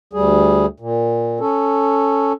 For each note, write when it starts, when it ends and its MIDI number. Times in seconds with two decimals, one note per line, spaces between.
0.13 0.66 38
0.13 0.66 55
0.13 0.66 68
0.80 1.40 46
1.40 2.33 61
1.40 2.33 69